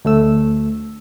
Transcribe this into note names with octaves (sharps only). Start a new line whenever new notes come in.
D2 A3 E6